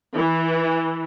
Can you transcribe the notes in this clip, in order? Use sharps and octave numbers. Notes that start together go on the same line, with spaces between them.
E3